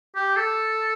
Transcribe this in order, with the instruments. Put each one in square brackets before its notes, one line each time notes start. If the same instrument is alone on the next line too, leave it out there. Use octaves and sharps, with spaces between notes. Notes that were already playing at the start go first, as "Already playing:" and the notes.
[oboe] G4
A4